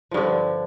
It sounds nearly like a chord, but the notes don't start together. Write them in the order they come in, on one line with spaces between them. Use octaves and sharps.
F3 G2 D3